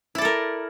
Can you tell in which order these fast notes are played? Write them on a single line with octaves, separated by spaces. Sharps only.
E4 D5 A4 A#4